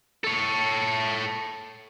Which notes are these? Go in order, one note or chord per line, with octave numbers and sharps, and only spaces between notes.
A4 C#5